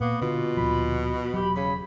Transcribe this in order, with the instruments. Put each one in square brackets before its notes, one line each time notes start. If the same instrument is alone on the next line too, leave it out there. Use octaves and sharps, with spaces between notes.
[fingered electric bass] A#2 [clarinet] A#3 [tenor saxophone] B3
[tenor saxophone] B2 [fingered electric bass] D3 [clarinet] F4
[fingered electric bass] D2 A#2 F3 [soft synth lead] B5
[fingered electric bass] E1 F#3 [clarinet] G4
[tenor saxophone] C#3 [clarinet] B5